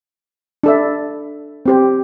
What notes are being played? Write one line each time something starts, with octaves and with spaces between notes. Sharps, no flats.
D4 A4 E5
C4 G4 C5